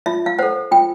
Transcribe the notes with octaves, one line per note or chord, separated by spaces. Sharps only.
F4 E5
F5
A4 C5 F#5
F4 G5